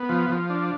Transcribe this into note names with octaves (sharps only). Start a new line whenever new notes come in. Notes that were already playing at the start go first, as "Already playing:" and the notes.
Already playing: B3
F3
F3
D4